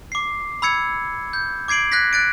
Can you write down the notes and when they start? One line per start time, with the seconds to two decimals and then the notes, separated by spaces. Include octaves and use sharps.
0.12 D6 C7
0.62 B5 E6 G#6 C#7
1.33 G6
1.68 D6 G#6 C7 D7 F#7
1.92 F#6 G#6 A#6 B6
2.13 F#6 A6 D7